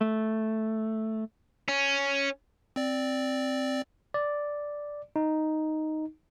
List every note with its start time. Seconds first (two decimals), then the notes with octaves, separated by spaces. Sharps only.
0.01 A3
1.68 C#4
2.76 C4 D5
4.14 D5
5.16 D#4